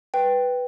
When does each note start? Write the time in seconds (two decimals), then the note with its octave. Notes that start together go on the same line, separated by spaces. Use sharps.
0.14 B4 G5